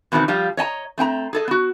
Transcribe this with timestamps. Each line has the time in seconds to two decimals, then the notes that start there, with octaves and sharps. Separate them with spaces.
0.12 E2 B2 D#3 B3 C4 D#4
0.28 F3 G3 F4
0.57 C#5 D#5 G#5 A#5
0.98 A3 C4 G5 A#5
1.33 G#4 A4 D#5
1.48 B3 F#4